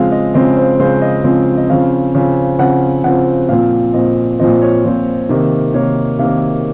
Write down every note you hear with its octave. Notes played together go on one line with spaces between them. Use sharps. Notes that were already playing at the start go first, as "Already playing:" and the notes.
Already playing: C#3 F3 G#3 C4 F5
D#5
C#3 F3 G#3 C4 D#5
C5
C#3 F3 G#3 C4 C5
D#5
C#3 F3 G#3 C4
D#5
C#3 F3 C4 F5
C#3 F3 C4
C#3 F3 C4 F#5
C#3 F3 C4 F#5
A#2 F3 C4 F5
A#2 F3 C4 D#5
A#2 F3 C4 D#5
C#5
A#2 F3 C4 C5
C3 D#3 A#3
C3 D#3 A#3 C#5
C3 D#3 A#3 F5